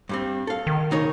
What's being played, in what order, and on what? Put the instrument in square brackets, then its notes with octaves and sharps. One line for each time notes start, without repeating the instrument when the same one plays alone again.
[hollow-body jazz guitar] G2 G3 C4
A4 F5
[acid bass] D#3
[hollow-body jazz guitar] C#3 D#4 C#5